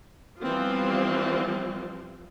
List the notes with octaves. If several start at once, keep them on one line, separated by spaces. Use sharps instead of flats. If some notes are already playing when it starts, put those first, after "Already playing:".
E3 F3 G3 B3 C4 F4